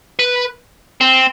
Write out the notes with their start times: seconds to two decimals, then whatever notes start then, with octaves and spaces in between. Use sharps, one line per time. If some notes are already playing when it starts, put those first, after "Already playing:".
0.19 B4
1.01 C4